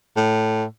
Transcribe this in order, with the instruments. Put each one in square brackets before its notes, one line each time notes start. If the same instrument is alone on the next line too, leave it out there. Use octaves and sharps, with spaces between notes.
[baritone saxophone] A2